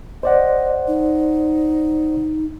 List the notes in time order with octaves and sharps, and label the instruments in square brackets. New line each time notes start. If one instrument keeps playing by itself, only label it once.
[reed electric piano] C5 D5 F#5 [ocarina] D#5
[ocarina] D#4